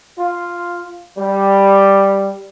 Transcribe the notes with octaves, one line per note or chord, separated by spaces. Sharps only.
F4
G3